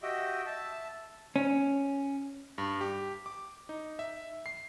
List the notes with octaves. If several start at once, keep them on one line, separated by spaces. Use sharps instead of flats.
F#4 G4 D#5 E5 G5
E5 A5
C#4
G2
G4
D6
D#4
E5
C7